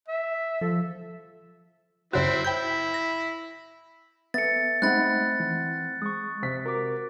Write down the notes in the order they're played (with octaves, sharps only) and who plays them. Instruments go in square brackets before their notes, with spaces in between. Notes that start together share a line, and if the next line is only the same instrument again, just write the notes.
[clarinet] E5
[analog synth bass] F3 [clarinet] A4
[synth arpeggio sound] F#2 C#3 F#4 [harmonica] C4 E4 C5
[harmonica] E4 [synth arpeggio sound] G5 G6
[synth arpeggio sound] A#6
[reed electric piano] B3 [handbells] A4 E5 [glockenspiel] A6 C#7
[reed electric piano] G#3 D#4 [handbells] A3 B5 [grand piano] C4 F#5 [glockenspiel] F#6 A6
[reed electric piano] E3
[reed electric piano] G#3 C#6 [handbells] D#6
[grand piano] C3 B6
[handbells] F#4 D6 [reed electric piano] A#4